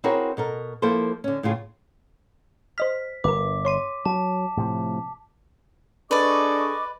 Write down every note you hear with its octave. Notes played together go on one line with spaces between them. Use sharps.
C4 E4 F#4 G#4 A#4 C#5
B2 A4 A#4
F3 A#3 E4 A4 C5
D3 C#4
A2 C#3 F4 G#4
C5 D#5 F6 B6
G1 A#4 B4 D6
C#5 C6 D#7
F#3 A5
A2 C3 F3
D4 G#4 A4 B4 D5 D#5 C#6 D6